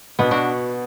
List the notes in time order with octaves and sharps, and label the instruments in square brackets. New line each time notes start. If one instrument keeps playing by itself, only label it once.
[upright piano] B2 [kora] B3 D4
[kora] D4 F#4